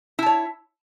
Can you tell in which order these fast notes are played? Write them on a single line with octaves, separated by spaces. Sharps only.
E4 A5 C#5